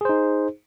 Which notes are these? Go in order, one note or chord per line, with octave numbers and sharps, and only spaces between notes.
D#4 G#4 C5